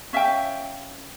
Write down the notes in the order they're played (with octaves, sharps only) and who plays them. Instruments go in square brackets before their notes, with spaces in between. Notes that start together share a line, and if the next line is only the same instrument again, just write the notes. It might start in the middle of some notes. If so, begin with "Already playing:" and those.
[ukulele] C#4 E5 F5 G5